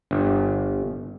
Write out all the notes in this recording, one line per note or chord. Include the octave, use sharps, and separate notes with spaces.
G1